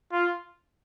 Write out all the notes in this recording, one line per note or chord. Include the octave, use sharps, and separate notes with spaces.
F4